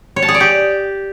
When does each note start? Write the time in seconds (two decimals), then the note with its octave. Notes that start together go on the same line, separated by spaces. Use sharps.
0.16 C#5
0.22 A5
0.28 G#4
0.34 D5
0.40 G4